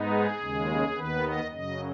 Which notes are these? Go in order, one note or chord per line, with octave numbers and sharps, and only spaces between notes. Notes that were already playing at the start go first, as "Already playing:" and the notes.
Already playing: G#2 G#3 B3 D#4
G#4
D#2 C#3 G#3
D#2 D#3 B3 B4
D#5
F#2 C#3 F#3 D#5